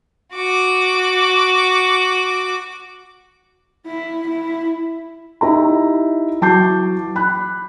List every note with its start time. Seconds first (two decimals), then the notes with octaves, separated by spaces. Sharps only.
0.35 F#4 D6
3.86 E4
4.28 E4
5.41 D#4 E4 G4 A#5
6.41 E3 F#3 A5 D6 G6 C7
7.16 B5 F#6